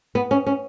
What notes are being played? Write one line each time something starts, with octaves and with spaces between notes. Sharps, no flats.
B3
C#4
C#4